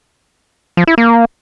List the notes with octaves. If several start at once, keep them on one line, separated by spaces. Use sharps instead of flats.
F3
E4
A#3